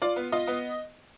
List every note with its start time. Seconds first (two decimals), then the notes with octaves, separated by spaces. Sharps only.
0.02 F4 D5
0.16 B3
0.32 F4 D#5
0.48 B3